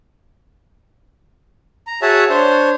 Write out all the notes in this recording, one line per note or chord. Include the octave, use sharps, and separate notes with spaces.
A#5
F#4 G#4 C#5 E5 F#5 A5
D4 C5 C#5